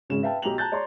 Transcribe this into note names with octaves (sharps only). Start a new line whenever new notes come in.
G#1 C#3 G#3 C#4 E7
B4 E5 F5 G5 A5
B1 G4 A#5 F7 F#7
A5 A#5 F#6 G6 A6
C#5 D5 A#5 C6